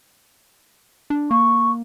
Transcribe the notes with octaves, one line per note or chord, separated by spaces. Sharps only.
D4
A#3 C#6